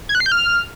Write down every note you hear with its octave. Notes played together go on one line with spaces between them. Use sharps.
G#6
F#6
C7
G6
F6